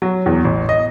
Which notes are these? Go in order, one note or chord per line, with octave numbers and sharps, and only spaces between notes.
F#3
E2
A1
D#5